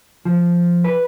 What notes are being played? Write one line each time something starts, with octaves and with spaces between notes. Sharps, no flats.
F3
B4